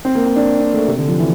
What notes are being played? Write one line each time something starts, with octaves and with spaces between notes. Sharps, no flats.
C4
A#3
C4
D4
C4
A3
C3
D3
F3
E3